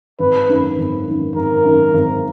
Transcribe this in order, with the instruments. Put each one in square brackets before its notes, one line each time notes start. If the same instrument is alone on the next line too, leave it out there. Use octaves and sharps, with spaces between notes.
[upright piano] G#1 [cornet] B4
[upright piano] F#2 D#3
G#1
F#2 D#3
[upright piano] G#1 [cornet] A#4
[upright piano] F#2 D#3
G#1